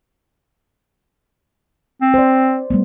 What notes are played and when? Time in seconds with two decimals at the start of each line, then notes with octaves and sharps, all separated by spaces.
2.02 C4
2.14 C5 D5
2.70 G3 A3 B3